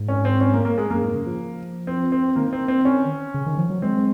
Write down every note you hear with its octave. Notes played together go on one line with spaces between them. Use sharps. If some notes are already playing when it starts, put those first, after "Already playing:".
Already playing: G#2
C#4
C4
C#4
A#3
A#3
G#3
F#2 A#3
G#2
C#3
F3
C4
C4
D#3 A#3
C4
C4
C#4
C#3
D#3
F3
F#3
G#3 C4